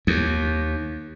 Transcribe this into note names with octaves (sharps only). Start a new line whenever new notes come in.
D#2